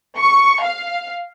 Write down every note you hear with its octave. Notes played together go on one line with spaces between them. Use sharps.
C#6
F5